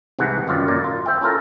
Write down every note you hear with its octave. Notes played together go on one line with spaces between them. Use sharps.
C2 G#2 C3 E3 F#5
G1 F#2 D#3 F4 D5
F#2 A#2 D5 A#5
F4
C5 E5 G5
C#4 E4 F4 A4 A#4